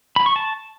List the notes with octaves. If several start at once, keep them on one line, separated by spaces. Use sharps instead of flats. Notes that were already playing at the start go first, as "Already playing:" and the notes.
B5
C#6
A5